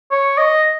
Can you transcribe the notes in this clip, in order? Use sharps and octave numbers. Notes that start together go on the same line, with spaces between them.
C#5
D#5